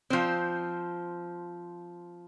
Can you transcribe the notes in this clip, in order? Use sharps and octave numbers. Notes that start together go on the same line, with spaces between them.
F3 C4